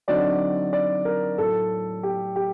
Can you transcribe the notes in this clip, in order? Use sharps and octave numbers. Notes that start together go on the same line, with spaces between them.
D3 F#3 C4 D#4 D5
D5
A#4
A2 F#3 A3 A4
G4
G4